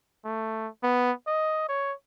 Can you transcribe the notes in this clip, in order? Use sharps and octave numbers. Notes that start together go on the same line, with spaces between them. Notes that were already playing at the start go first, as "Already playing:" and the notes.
A3
B3
D#5
C#5